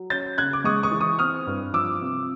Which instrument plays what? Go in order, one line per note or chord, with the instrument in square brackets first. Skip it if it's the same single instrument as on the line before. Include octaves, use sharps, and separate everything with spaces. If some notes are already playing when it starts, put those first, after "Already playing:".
Already playing: [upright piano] F#3
C#4 G6 A6
C#3 F#6 G#6
D6
G#3 C#6 D#6
C#6 D#6
E3
C#6 D#6
C4 D#6 F6
G2
F3 D6 E6
C3